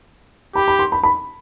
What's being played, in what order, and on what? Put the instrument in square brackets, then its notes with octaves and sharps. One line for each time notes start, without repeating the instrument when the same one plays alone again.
[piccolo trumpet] G4 [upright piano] B5
[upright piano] B5
C6
B5
B5